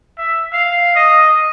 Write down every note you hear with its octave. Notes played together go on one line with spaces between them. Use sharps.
E5
F5
D#5